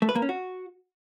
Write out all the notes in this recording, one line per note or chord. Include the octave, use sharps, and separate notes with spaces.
A3
B4
A#3
C#4
F#4